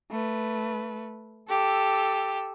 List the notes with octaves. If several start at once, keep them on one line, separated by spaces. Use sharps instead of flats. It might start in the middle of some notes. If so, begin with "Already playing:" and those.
A3 B4
G4 A4 E6